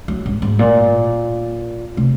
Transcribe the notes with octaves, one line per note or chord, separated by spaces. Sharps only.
F#3
G#2
G#2
A#2
C3